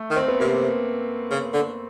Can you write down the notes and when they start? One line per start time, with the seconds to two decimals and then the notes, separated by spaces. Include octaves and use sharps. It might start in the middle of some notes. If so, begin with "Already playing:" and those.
Already playing: A3
0.10 D#3
0.16 C4
0.28 B3
0.40 C3 A#3
1.31 C#3
1.54 D3